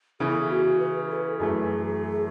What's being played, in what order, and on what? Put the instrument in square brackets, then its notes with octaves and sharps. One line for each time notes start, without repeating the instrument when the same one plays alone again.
[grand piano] C#3 E3 B3 [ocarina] G#4
[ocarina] A4
G#4
F#4
B4
A4
[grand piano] F#2 E3 A3 [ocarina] G#4